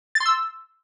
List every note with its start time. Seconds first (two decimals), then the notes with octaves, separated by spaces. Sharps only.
0.15 A6
0.20 C6
0.26 E6